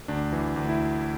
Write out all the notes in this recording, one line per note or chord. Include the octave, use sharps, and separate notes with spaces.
D2 D4
E3
D2
E4